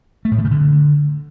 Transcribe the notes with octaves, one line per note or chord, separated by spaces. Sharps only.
A3
A2
D3
C#3
D3